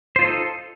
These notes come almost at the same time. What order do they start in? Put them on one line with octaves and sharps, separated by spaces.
C5 F4 D#4 A4